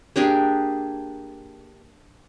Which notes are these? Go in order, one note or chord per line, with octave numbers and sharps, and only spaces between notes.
A#3 D4 G4 G#4